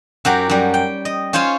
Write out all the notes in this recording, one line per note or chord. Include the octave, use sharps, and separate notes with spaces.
F#2 F#3 G4 A#5
F#2 G3
G5
D#5
C#4 F4 C5 C#5 G#5